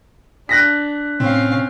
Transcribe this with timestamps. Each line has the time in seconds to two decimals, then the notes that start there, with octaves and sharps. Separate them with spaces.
0.49 D4 F#6 A#6 B6
1.20 A2 C3 C4 C#4 F5